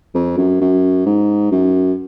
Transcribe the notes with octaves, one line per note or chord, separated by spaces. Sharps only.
F2
F#2
F#2
G#2
F#2